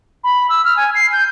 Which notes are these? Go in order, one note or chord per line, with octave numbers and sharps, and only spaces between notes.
B5
E6
F6
G#5
C7
G6